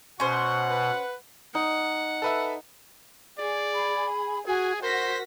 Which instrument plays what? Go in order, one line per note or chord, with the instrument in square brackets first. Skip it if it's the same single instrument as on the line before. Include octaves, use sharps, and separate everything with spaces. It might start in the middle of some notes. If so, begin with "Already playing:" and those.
[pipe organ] B2 [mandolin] C#4 C5 [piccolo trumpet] F#5 [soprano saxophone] C#6
[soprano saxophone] B4
[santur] D#4 [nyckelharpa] F#5
[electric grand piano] A4 B4 E5
[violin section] G#4 [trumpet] D5
[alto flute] B5
[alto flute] F#4 [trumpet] G#4 [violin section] G#5
[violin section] F#4 A#6 B6 [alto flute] A#4 [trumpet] C5